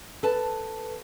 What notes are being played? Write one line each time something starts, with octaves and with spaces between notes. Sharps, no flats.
A4 B4 A5